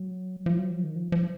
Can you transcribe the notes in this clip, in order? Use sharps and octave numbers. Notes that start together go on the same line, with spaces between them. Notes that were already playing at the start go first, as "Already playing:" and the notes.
Already playing: F#3
F3
F#3
F3
D#3
F3
F3